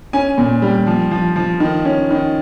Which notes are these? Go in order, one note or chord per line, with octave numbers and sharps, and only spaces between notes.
C#4 G#5
A#2
G3
F3
F3
F3
D#3
C#4
D#3